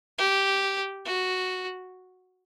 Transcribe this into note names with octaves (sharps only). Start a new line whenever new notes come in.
G4
F#4